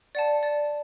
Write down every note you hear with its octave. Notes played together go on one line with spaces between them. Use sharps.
D5 F#5 A5
D5